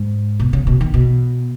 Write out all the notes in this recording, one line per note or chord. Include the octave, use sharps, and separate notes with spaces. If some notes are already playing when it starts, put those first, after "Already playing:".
Already playing: G#2
B2
C#3
B2
D#3
B2